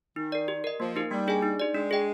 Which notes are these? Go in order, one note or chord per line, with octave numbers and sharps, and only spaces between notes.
D#3 D#4
A#4 D5
G4
A#4 D#5
F3 A#3
D#4 G4 A#4
G3 A#3
D4 G#4 D#5 G#5
D#4
G4 D5
G#3 D4
G#4 D#5 G5